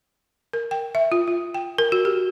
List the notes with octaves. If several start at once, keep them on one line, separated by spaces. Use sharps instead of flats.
A#4
G5
E5
F4
F4
G5
A#4
F#4
G4